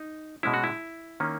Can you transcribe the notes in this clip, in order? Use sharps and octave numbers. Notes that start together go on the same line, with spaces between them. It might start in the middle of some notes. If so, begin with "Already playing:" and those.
Already playing: D#4
B2 G#3 C#4 E4
F#4
E4
D#3 A#3 C#4